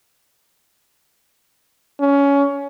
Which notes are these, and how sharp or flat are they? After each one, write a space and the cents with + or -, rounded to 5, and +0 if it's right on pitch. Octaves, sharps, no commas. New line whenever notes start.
C#4 +20